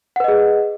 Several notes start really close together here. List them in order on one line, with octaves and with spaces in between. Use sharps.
F#5 B4 D#5 G#4